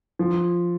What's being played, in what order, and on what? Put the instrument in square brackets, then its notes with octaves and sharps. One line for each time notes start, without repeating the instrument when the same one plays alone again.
[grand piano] F3